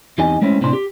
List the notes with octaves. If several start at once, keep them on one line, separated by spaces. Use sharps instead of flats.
E2 C4 D#4 G4 D#5 G#5
G#3 A3 C4 C#4 E4
A2 C3 C4 D4 B5 C6
G4